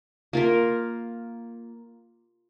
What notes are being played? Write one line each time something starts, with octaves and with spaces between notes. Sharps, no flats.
A#3 F4 A#4